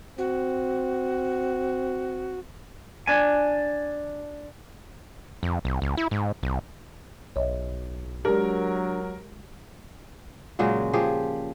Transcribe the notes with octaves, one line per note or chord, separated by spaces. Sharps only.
C4 F#4
D4 G#5
F2
C2
C#2
E4
G#2
C2
B1 C#5 D#5 E5
F#3 G#3 D4 G4 A#4
A#2 C#3 F#3 G#3
F3 G4 G#4